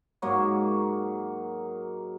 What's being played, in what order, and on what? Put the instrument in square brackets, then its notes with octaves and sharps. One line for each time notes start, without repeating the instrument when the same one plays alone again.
[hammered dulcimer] G#2 F#3 A#3 C#5